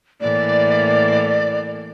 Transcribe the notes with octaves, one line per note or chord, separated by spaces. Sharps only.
A2 E3 A#3 D5